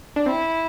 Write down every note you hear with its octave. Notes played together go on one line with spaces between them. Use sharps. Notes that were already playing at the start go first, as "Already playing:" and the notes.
D4
C4 E4